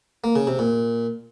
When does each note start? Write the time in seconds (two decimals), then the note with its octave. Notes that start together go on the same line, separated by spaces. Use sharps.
0.24 A#3
0.36 C#3
0.47 C3
0.59 A#2